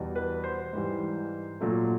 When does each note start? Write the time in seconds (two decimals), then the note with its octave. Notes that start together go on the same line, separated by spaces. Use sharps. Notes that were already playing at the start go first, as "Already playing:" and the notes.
Already playing: E2 B2 G3
0.16 B4
0.44 C5
0.73 G#2 E3 G3
1.61 A#2 F#3 A3